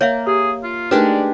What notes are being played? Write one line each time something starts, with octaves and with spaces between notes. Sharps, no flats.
A#3 C#5 E5 F5
G4 G#4
F4
G#3 A3 D4 D#4 G4 A#4 B4 D5